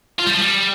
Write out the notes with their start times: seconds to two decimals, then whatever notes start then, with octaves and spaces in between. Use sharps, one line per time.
0.19 F4
0.26 G3
0.34 F3
0.41 G3